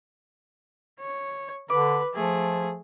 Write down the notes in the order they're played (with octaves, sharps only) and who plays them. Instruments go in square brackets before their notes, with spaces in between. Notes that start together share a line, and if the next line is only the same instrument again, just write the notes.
[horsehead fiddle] C#5
[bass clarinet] D3 [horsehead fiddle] B4 [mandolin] D6
[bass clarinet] F3 [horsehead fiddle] A3 G#4